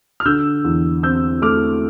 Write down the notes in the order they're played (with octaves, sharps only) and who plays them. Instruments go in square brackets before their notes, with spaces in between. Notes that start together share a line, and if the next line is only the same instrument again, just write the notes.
[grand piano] F6
D3 E6 G6
E2
C4 E6 G6
A3 D6 F6